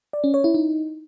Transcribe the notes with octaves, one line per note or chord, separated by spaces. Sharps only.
D5
C#4
C#5
E4
D#4